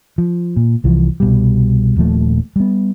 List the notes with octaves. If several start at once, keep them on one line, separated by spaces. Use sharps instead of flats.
F3
A#2
C2 E3 F3
C2 B2 G3
D#1 A#2 F3 A3
G3 B3